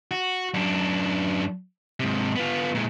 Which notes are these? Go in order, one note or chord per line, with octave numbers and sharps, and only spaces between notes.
F#4
F#2 D4
G#2 C3
B3 F4
A#2 G#3